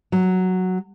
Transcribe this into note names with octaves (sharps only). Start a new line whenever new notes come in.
F#3